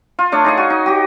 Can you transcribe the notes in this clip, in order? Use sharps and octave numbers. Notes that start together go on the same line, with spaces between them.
F4
A3 D4 C#5
D#4 G#4 D#5
F#4
D#4
F#4 G4